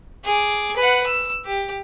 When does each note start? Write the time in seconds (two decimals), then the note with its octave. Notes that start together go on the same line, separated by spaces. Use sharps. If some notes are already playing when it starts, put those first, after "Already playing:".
0.25 G#4 D6
0.76 B4 F#5
1.07 E6
1.45 G4